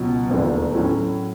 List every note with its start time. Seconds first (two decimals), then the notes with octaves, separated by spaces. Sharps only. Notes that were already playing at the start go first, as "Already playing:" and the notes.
Already playing: C#2 B2 F#3
0.30 E1 D#2 D3 F3 A3
0.75 A2 F#3 A3 C#4